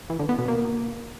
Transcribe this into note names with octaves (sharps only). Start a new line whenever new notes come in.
E3
D3
B3
B2
A#3